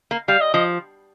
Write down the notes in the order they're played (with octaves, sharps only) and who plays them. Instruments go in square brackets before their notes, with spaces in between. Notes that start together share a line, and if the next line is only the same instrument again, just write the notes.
[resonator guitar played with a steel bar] A#3
[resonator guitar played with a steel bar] G3 [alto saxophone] F5
[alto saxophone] D#5
[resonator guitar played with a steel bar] F3 [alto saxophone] D#5